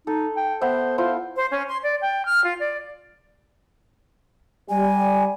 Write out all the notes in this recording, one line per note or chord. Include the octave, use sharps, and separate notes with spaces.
D#4 A4
G5
B3 C5 E5
E4 F4 C5
C5
C#4
C6
D5
G5
F6
F4
D5
G3 G#5